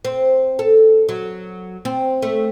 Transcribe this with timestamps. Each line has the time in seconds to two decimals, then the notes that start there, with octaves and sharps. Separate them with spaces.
0.05 C4
0.59 A4
1.09 F#3
1.85 C4
2.22 A3